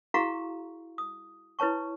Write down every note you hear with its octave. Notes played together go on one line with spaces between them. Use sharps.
E4 F#4 G#4 F5 A#5 C#6
D#6
E4 B4 C#5 A5 C#6